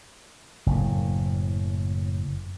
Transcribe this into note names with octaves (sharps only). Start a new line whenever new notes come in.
F#1 A2